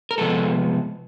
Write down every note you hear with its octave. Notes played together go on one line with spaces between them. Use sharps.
A#4
C3 F3 G#3 B3 A4